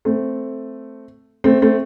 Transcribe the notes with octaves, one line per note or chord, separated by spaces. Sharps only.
A3 C4
A3 C4
A3 C4